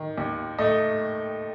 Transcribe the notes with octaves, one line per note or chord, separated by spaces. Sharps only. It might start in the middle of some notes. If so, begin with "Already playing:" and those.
Already playing: D#3
D#2
A3 D#5